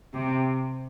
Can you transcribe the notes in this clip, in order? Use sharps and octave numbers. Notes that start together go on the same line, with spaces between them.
C3